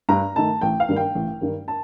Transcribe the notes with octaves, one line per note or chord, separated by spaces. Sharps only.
G2 A#5
D#3 A3 D#4 A5
A1 G5
F5
G2 D#3 G3 A#3
G5
A1
G2 D#3 G3 A#3
A5